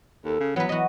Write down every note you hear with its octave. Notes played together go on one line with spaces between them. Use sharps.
D#2 A4
C#3
E3 F#3 B3 B4
E3 F#4 D#5